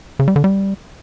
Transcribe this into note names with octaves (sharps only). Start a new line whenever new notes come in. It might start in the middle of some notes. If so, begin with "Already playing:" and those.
C#3
G3
D3
G3